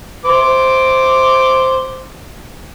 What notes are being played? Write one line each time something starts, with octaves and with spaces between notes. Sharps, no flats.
C5 D6